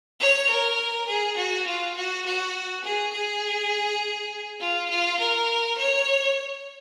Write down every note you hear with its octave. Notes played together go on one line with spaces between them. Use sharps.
C#5
A#4
G#4
F#4
F4
F#4
F#4
G#4
G#4
F4
F4
A#4
C#5